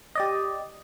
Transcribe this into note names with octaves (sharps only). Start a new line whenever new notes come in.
G4 D5 D#5